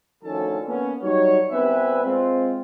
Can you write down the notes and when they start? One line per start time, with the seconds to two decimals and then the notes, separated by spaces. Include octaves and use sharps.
0.24 D2 D#3 F3 C#4 A4 A5
0.66 A#3 B3 C#4
1.03 F#3 G3 D#4 C#5
1.51 C2 B3 C4 B4 E5 G#5
2.04 G#3 C4 F4